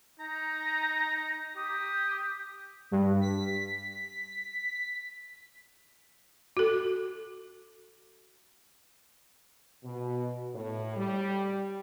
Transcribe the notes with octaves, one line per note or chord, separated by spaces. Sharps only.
D#4 A#5
G4 D#6
G2
B6
F#4 A4
B2
A2
G3